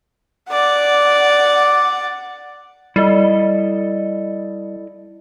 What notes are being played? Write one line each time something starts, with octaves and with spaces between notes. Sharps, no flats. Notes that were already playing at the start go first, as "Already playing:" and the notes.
D5 F#5
G3 E4 A4 D#5